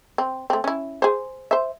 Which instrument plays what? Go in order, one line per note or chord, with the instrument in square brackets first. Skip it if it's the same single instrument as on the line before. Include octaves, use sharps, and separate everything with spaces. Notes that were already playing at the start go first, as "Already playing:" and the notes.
[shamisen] C4
A3 C4
C#4 E4
G#4 C5
C5 E5